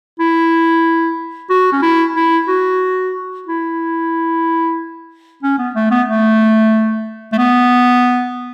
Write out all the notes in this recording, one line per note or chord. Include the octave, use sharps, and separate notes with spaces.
E4
F#4
C#4
E4
E4
F#4
E4
C#4
B3
A3
B3
A3
A3
B3